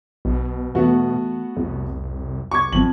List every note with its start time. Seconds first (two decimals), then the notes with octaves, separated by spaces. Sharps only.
0.25 B1 B2
0.75 E2 A3 B3 F#4
1.57 C2 F2
2.51 C2 C#6 D6 G#6
2.73 G#1 F2 F#7